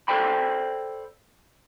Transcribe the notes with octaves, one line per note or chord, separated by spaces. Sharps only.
A4 C5 D5 G5 B5